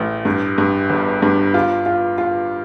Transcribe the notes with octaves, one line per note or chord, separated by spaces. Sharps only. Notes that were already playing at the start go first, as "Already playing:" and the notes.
Already playing: A1 A3
G2
G2
G1
G2
F4
F4
F4